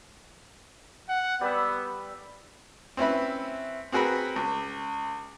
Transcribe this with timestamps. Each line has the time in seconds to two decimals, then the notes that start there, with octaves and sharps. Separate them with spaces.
1.09 F#5
1.41 G3 B3 B4 E6
2.97 C4 C#4 E4 B4
3.92 C4 F#4 G#4 A#4 B4
4.36 C#2